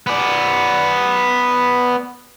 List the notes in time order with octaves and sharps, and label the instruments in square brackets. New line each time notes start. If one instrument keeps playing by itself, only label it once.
[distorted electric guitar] B3 D5